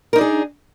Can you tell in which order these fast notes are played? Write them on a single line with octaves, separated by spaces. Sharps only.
A#4 D#4 D4 G#4